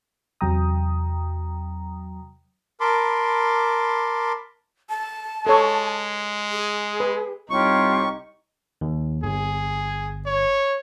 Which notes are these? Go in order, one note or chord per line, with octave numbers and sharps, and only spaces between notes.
E2 C3 F#3 G5 A#5 D#6
A#4 A5 B5 C6 D6
A5
G#3 A4 C#5
G#4
B4
C2 D#4 F4 G4 C#5 C#6
D#2
G1 G#4
C#5